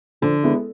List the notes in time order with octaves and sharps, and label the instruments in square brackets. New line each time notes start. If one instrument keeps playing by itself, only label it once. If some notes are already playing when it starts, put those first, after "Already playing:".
[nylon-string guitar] D3 [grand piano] F3
[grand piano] G#3 B3 E4